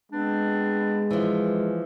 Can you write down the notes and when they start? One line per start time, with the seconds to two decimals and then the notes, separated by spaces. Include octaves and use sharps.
0.12 G#3 B3 C4 D4
1.11 E3 F3